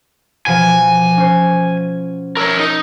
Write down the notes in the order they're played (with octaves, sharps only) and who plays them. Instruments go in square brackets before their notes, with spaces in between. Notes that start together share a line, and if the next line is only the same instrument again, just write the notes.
[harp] B2 F3 [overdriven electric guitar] G#5
[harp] C#4 C5
[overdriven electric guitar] A#4 C#5 [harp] A5 E6
[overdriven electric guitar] D#4